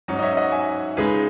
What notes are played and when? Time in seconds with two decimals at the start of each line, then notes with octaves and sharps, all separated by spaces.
0.08 G#2 F#3 C#4 D#4 F#4
0.19 D#5
0.22 C#5 E5
0.37 D#5 F#5
0.52 E5 G#5
0.97 C#2 C#3 G#3 D#4 G#4 B4